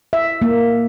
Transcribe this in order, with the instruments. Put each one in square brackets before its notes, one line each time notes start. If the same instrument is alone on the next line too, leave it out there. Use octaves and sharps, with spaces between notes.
[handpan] E5
A#3